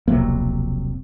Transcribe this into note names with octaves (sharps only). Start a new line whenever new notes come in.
D#1 B1 F2 C3 F#3 A#3